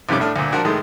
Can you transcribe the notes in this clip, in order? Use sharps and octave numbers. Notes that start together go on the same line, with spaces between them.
C2 F2 D#3 G3 C#4 D6
A2 A3 D4 F6
D2 A#2
F3 D4 F#4 A#4
A2 D#3 G#3 A3